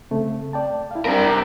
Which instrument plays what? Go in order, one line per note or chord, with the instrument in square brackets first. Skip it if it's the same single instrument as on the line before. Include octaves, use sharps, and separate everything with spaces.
[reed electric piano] C#3 A3 C4
D5 G5 A5
E4 F5
[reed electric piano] F#2 G3 C4 [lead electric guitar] D4 A#4
[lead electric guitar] C3